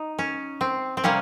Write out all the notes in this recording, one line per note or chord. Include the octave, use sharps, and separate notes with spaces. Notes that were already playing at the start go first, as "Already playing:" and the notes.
Already playing: D#4
C#4
C4
C4
C3 G3 A#3 C#4